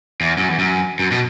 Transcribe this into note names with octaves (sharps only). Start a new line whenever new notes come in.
E2
F#2
E2
F#2
F#2
B2